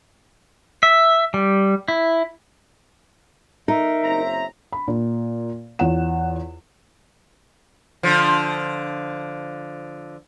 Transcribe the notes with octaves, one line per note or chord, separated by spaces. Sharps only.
E5
G3
E4
D#4 A#4 E5
F#1 C4 A#5
B5
A#2
E2 F4 C#5 F#5 E7
D3 F3